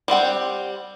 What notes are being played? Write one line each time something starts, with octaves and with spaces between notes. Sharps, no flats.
G3 C4 F#5 G5